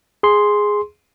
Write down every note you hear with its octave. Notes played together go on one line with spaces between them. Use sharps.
G#4 C6